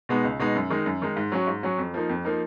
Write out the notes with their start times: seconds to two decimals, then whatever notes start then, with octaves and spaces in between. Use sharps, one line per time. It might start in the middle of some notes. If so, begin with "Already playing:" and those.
0.09 B2 G#3 B3 D#4
0.24 C#2
0.39 B2 G#3 B3 D#4
0.55 F#2
0.70 D#3 G#3 D#4
0.86 F#2
1.02 D#3 G#3 D#4
1.17 G#2
1.32 F#3 C#4 F#4
1.47 G#2
1.63 F#3 C#4 F#4
1.78 F2
1.94 F3 A#3 D#4
2.09 F2
2.25 F3 A#3 D#4